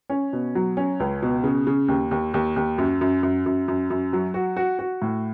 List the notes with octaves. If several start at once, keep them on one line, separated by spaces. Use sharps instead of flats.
C#4
B2
F#3
C#4
C#2
B2
C#3
C#3
D#2
D#2
D#2
D#2
F#2
F#2
F#2
F#2
F#2
F#2
F#3
F#4
F#4
F#4
A2